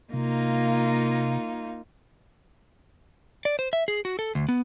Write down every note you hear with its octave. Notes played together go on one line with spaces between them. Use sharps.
C3 A#3 D#4 F4
D5
C5
E5
G#4
F#4
A4
D2
B3